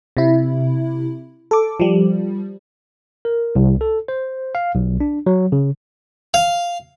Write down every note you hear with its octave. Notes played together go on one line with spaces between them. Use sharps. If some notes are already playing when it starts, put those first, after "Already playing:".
C3 E4
A4 D6
F3 G3
A#4
C2
A4
C5
F5
B1
D4
F#3
C#3
F5